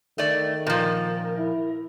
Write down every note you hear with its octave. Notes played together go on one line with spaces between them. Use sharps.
D#3 A3 D5
A#2 F3 A#4
E4